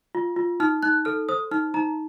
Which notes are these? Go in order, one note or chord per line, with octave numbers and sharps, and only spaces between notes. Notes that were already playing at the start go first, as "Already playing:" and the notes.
F4
F4
D#4 F6
D#4 F#6
A4 F6
C5 D#6
D#4 F6
D#4 A#5